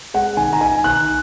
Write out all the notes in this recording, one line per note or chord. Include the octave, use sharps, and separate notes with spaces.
G#3 F#5
D#3 G#5
A#5
D#4 G#5
D#3 F#6